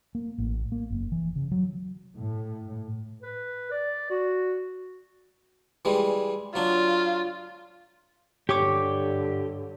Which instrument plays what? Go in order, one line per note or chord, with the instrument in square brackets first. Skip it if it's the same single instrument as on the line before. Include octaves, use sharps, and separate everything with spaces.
[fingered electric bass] A#3
A1
A#3
F#1
E3
C#3
F#3
[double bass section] A2
[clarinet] B4
D5
F#4
[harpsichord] E3 G3 G#3
[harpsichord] F#3 D4 [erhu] F4
[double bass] G2 D3 [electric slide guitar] G4 [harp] C#5 D6